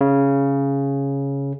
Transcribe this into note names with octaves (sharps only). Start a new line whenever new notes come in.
C#3